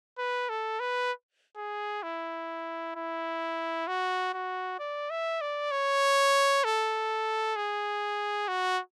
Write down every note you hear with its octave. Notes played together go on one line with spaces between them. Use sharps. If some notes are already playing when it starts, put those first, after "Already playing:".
B4
A4
B4
G#4
E4
E4
F#4
F#4
D5
E5
D5
C#5
A4
G#4
F#4